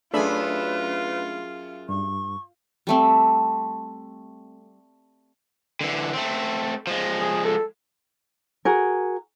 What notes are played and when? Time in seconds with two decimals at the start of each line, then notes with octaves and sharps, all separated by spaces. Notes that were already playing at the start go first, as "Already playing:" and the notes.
0.14 F#2 A3 D4 F4 G#4 B4 E5 B5
1.89 G2 C#6
2.87 G3 A3 C4
5.81 D3 E3
6.13 A3 C4
6.87 F3 G#3
7.20 G#4
7.45 A4
8.65 F#4 G#4 A#4